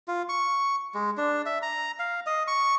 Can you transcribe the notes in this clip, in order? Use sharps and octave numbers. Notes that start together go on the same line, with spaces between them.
F4
C#6
G#3
D4
E5
A#5
F5
D#5
C#6